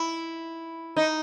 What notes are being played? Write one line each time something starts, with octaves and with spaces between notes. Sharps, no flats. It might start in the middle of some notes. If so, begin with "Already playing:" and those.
Already playing: E4
D#4